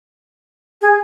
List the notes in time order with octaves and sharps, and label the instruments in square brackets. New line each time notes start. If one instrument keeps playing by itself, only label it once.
[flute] G#4